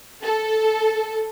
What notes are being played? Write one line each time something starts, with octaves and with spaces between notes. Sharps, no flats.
A4